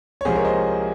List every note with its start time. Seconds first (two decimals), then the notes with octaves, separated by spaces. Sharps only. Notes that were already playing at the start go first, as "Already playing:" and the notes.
0.21 C#5
0.25 C2 C3 F3 G#3 G#4 C5
0.35 A#4 C#5
0.45 C5 D#5